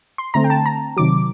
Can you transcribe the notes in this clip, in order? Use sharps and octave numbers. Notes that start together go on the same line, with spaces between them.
C6
D3 A3 C4 A#5
G5
A5
A#5
C3 D#3 F#3 D6